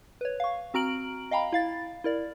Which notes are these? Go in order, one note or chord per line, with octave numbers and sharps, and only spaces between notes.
B4 C#5
F5 C#6
C4 F#4 A#5 F6 D7 F#7
D#5 F5 G5 A#5 B5
E4 F5 A6
E4 A#4 D5